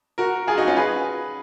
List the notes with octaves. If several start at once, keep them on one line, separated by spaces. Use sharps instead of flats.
F#4 A#4
F4 G#4
D#4 F#4
C#4 F4
G#4 B4